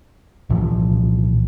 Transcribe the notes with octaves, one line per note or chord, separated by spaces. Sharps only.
C2 A#2 E3 F3